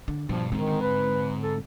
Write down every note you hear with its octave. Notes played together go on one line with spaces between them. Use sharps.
D3
G2 B2 F3
G#2 D3 D#3 C4
B4
A4